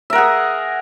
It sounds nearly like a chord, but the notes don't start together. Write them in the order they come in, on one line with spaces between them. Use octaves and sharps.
E5 A#4 F#5 G#4